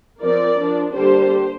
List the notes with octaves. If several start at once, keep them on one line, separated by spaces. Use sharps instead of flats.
F3 C4 A#4 D5
F3 D4
D3 G3 A#3 D4 G4 C5